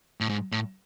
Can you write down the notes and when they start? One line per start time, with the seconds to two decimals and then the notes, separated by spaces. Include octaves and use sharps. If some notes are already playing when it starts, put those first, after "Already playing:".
0.21 A2
0.29 G#2
0.52 A2